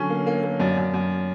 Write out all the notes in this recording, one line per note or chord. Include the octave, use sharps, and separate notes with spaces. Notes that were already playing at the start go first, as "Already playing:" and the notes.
Already playing: D3 F#3 C#4 C#5
A#3
A#3
A#3
F#2 D5
F#2
F#2